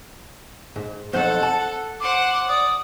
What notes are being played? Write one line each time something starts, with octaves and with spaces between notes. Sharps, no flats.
G#2
B1 F2 A4 C5 F#5
A5
C5 F#5 D6
D5 D#6